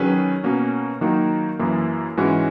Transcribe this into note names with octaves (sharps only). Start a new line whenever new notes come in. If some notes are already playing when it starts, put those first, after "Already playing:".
Already playing: D#3 F#3 C#4 G#4 B4
B2 A#3 C#4 F#4
D#3 F#3 A#3 D#4 F#4
F#2 E3 A#3
G#2 E3 G#3 C#4 F#4